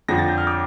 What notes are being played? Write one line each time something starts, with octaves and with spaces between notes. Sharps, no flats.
F2 D3 F3 A#6
A6
G6
F6
D6